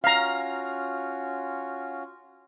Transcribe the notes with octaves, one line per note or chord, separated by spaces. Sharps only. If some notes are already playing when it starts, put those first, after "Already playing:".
C#4 F4 F#4 F5 A#5